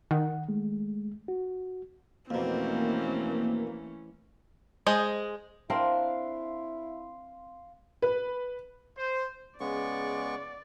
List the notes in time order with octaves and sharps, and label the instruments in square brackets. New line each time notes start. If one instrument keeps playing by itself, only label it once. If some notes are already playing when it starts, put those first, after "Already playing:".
[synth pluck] D#3 [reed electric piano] F#5
[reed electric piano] G#3 A3
F#4
[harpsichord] F2 B2 [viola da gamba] E3 A3 C#4 [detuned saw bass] A#3 [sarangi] C4
[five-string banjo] G#3 C5 D#5
[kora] C4 D4 A#4 [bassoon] E4 [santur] F5 C6
[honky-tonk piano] B4
[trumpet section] C5
[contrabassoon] C#3 [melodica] G#3 B3 C#6 [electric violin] D5